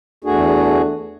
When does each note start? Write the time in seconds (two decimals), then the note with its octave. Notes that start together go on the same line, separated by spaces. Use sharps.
0.24 E2 A3 D4 F#4 G#4